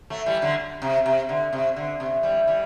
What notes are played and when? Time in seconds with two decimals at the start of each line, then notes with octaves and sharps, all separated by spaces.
0.10 F#3 A3
0.26 E3 G3
0.42 D3 F#3
0.82 C3
1.06 C3
1.29 D3
1.53 C3
1.76 D3
2.00 C3
2.23 E3 G3
2.47 E3 G3